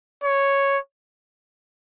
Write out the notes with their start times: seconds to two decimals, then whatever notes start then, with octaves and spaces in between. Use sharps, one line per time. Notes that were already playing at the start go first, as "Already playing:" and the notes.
0.24 C#5